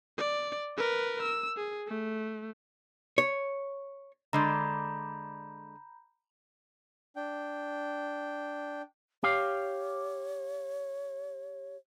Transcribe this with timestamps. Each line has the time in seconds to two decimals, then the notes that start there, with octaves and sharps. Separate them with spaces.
0.18 D5
0.77 A#4 B4
1.22 E6
1.57 G#4
1.87 A3
3.18 C#5
4.33 D3 G#3 D5 A#5 B5 G6
7.16 D4 G5
9.24 G4 C#5 F5